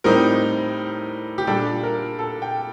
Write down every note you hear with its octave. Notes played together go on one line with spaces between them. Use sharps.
A2 G3 C4 D#4 A#4
G4
A#2 G3 D4 A4
A#4
A4
G5